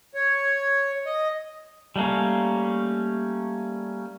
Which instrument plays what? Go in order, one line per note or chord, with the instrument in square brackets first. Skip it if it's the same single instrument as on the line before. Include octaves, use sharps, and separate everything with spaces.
[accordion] C#5
D#5
[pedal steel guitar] G3 A3 A#3 C#4